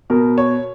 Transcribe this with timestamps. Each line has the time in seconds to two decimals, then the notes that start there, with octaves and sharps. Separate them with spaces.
0.10 B2 A#4
0.38 C#5